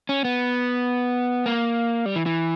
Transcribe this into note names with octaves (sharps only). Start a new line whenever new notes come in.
C#4
B3
A#3
G3
E3
E3